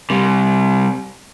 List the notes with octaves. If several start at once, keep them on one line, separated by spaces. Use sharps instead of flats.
C3 G3